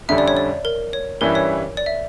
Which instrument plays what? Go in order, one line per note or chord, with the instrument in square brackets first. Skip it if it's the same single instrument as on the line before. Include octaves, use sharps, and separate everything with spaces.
[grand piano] F2 D3 G3 C#4 [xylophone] E5
[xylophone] D5
C#5
D5
A#4
C#5
[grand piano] G2 E3 G3 C#4 E4 [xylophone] A#4
[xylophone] C#5
D5
E5